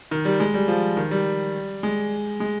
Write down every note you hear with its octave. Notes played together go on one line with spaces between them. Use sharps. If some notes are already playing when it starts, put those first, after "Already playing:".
D#3
G3
G#3
G3
F3
D#3
G3
G#3
G#3